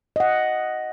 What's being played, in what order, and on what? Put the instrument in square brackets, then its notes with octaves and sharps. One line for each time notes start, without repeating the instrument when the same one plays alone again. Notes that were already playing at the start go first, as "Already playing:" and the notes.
[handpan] D#5 F#5